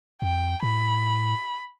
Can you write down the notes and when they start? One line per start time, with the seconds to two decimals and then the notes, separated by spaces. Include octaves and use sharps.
0.22 F2 G5
0.63 A2 B5